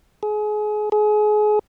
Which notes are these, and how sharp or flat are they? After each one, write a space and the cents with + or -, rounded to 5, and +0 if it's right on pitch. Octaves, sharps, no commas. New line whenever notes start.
G#4 +30
G#4 +30